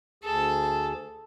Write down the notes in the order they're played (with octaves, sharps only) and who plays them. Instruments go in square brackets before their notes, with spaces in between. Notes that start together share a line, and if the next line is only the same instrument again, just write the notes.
[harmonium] D2 G#4 [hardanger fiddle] A4